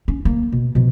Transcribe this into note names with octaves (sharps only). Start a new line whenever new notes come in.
C#4
D2 A#3
B2
B2 F3